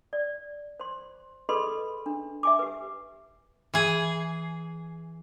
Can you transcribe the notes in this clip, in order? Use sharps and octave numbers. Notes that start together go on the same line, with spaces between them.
D5
C5 C6
G#4 A4 B4 D#5 B5 C6
D4
E5 G#5 D6
G4 B4
E3 G#4